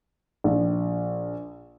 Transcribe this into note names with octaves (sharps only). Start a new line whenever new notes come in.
A#1